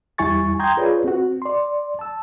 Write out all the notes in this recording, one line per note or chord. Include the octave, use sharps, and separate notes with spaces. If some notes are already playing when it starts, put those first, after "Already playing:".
E2 G3 E4 G#5 C#6 A6
G5 A#5 C6 D#6 G6 G#6
F4 G#4 B4 C#5 D5
C4 F#4
D5 C6
A5 E6